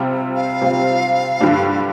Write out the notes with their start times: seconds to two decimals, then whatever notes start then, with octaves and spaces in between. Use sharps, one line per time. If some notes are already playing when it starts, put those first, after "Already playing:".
Already playing: C3 G3 C4 F4
0.36 F5
0.61 C3 G3 C4 F4
1.41 G2 D3 G3 D4